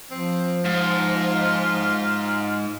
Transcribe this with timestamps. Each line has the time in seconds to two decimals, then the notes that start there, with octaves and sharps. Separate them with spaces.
0.11 F3 C4
0.65 G#2 F4